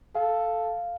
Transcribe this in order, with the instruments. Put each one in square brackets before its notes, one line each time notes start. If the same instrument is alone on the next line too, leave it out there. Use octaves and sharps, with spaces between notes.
[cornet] A4 [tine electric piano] F5